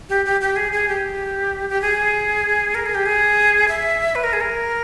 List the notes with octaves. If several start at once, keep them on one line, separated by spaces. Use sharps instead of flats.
G4
G4
G4
G#4
G#4
G4
G4
G#4
A#4
G#4
G4
G#4
E5
B4
A#4
G#4
A#4